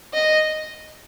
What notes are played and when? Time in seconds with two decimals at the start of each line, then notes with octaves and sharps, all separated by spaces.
0.14 D#5